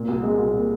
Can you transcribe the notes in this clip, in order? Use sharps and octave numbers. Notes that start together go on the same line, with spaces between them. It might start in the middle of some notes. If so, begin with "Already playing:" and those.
Already playing: A#2
C2
G#3
C2
A#2